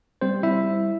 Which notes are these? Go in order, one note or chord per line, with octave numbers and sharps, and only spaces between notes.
G3 C4 C5
G3 E4 E5
G3